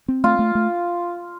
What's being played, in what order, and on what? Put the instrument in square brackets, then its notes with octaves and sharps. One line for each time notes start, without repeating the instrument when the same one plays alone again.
[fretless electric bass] C4
[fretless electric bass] A3 [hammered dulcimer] F4
[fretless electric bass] A3
A3